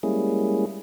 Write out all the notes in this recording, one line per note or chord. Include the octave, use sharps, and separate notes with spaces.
G3 G#3 A#3 C#4 E4 G#4